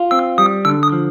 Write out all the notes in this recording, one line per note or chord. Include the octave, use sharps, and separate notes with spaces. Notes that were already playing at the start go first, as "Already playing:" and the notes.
Already playing: F4
C4 E6
G3 D#6
D3 E6
D#6
F3